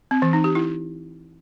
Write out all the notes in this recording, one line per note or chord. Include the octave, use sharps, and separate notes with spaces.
C4
E3
D#4
G4
E4